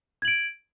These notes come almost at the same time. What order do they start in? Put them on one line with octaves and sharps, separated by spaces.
G#6 F#7 D7